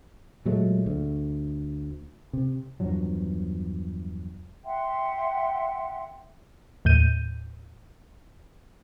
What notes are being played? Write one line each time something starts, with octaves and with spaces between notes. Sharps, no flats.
A#2 F#3 G#3 A3
D2
C3
E2 G2 F3 F#3
E5 F#5 G5 C6
D#2 A2 G6 D#7